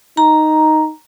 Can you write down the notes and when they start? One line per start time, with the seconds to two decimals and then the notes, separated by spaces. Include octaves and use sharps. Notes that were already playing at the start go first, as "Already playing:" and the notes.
0.17 D#4 A#5